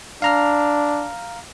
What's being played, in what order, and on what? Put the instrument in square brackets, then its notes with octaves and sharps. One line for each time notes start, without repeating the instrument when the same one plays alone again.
[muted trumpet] D4 [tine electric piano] F5 A#5 F6